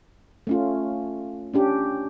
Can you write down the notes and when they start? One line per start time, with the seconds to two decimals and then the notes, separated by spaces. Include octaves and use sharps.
0.47 A3 C#4 F4
1.54 C#4 D4 G4